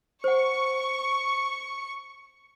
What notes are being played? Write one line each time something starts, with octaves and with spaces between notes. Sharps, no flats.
C5 F#5 C#6